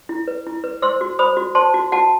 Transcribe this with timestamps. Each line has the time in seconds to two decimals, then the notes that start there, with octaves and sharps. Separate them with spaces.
0.09 E4
0.28 B4
0.47 E4
0.64 B4
0.82 C5 C6 E6
1.01 F#4
1.19 C5 B5 D#6
1.37 F#4
1.55 C5 A5 C6
1.74 F#4
1.92 F#4 F#5 A5